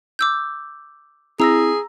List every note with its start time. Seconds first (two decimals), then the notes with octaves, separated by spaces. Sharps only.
0.19 D6 E6 G6
1.40 C4 E4 G#4 A#5 E6 A#6